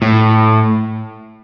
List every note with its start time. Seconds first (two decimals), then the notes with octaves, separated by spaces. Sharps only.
0.02 A2